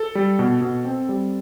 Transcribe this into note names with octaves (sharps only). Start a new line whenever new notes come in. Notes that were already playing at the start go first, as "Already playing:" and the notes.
Already playing: A4
G3
B2
B2
C4
G3